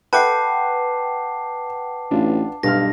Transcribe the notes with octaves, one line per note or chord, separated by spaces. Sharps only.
A4 B4 E5 F#5 G5 A5 D6 C7
A1 D4 F4
B1 G2 F5 F6 A#6